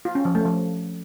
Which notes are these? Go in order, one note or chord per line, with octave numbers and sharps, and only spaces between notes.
F4
C#4
F3
A3
F3